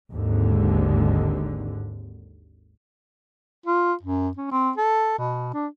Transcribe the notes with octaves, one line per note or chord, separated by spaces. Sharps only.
G#1 D#2 G#2 D3
F4
F#2
C#4
C4
A4
B2
D4